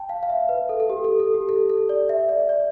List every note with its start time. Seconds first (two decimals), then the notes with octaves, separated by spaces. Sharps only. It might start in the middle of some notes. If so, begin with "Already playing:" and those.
Already playing: G5 A5
0.09 F5
0.23 F5
0.29 E5
0.49 B4
0.69 A4
0.80 A4
0.90 G4
1.04 A4
1.19 A4
1.34 G4
1.49 A4
1.70 A4
1.89 D5
2.09 E5
2.29 D5
2.49 D5